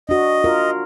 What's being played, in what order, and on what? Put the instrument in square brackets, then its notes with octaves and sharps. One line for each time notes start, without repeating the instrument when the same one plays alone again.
[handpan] D4 F#4 [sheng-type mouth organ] D#5
[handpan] F4 A#4